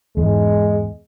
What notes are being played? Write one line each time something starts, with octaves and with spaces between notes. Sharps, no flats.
E2 G#2 G#3